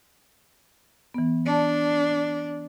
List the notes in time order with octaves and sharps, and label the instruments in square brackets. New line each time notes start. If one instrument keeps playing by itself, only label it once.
[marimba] E3 B3
[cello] D4 [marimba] D5 A5